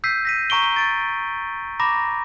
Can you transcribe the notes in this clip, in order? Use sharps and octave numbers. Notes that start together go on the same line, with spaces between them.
E6 G6 B6 C7 D#7
A#6 B6 D#7
A#5 C#6 D7 G7
A6 D7
A#5 B5 D6 A#6